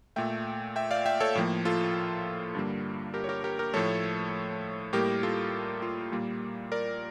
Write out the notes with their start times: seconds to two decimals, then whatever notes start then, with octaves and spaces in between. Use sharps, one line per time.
0.16 A#2 A3 E5 G5
0.76 E5 G5
0.91 D5 F5
1.06 E5 G5
1.20 A4 C#5
1.35 A2 F3 A#3
1.65 F4 A4
2.55 G2 D3 G3 A#3
3.14 G4 A#4
3.24 C#5
3.29 G4 A#4
3.44 G4 A#4
3.59 G4 A#4
3.74 A2 F3 A3 A4 C#5
4.93 A2 G3 A#3 G4 A#4
5.23 F4 A4
5.82 F4
6.12 A#2 G3 A#3
6.72 A#4 D5